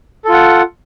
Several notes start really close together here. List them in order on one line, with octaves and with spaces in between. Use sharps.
A4 F4 F#5